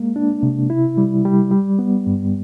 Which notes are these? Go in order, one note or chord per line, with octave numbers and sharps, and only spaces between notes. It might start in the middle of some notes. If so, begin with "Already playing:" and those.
Already playing: G#3 A#3
D4
C3
E4
G3
G3
G3
B3
G2